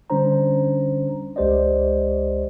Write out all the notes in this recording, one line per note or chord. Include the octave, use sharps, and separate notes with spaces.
D3 G3 C#4 D4 C5 A#5
C#2 G#3 G4 C5 D5 D#5